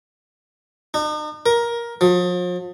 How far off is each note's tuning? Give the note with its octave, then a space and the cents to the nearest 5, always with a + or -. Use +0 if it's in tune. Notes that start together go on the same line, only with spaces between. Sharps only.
D#4 -45
A#4 +15
F3 +40